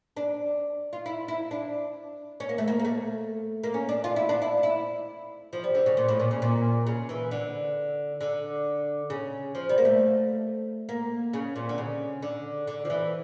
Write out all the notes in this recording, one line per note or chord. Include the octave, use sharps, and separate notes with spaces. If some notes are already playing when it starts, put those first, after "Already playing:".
D4
F4
E4
E4
D4
C#4
A#3
A3
A#3
A#3
A3
A#3
C#4
D4
F4
E4
D4
E4
E4
F3
G3
D3
C#3
A#2
A2
A#2
C#3
A#2
C#3
E3
D3
D3
C#3
F3
G3
A#3
A3
A#3
C#3
A#2
D3
C#3
D3
D3
F3
E3